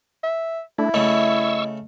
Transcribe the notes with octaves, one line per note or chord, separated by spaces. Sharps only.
E5
A3 D4 E4
C#3 A3 D#5 C#6 E6